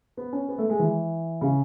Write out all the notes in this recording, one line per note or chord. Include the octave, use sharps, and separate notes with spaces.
B3
C#4
B3
A3
G#3
E3
C#3